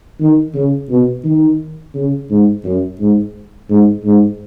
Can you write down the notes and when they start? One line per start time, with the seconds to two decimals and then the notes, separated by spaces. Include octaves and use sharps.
0.20 D#3
0.54 C#3
0.89 B2
1.24 D#3
1.94 C#3
2.30 G#2
2.64 F#2
3.00 G#2
3.70 G#2
4.05 G#2